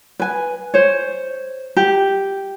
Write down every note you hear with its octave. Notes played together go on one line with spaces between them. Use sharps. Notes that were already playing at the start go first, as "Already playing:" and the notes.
B4 G#5
C5 C#5
G4